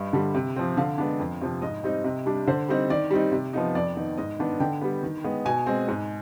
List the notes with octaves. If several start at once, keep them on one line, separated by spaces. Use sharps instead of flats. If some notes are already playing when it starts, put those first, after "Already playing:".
Already playing: G2 D#5
D3 G3
C3
F3 C4
D3 F5
G#3 B3 D4
F2
C3 F3
G#2 D#5
G3 C4 D#4
C3
G3 D4
D3 C5
G3 C4 D#4
D#3 D5
G3 C4 D#4
C3
F3 B3 D#4
F2 D5
D#3 B3 D#4
G#2 D#5
D#3 B3 D4
D3 G5
G3 B3
D#3
G#3 B3
B2 G#5
G#3 C4
G#2